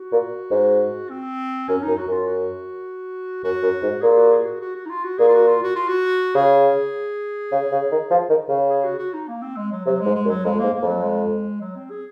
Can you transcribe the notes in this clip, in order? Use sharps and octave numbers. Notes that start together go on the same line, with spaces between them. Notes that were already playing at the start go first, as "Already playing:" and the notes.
Already playing: F#4
A#2
G#2
C4
F#2 C#4
F#2 D#4
F#4
F#2 F4
F#4
F#2 F#4
F#2
G#2
A#2 G#4
F#4
G#4
F#4
F#4
F#4
D#4
F4
F#4
A#2 G#4
F4
F#4
F4
F#4
F4
F#4
C#3 G#4
C#3
C#3
D#3
F3
D#3
C#3
G#4
F#4
F#4
D#4
A#3
C4
G#3
F#3
C3 F#3
G#3
G#2
G#3
F#2
F#3
F2 G#3
G#2 A#3
A#3
F2 F#3
G#3
F#3
C4
G#4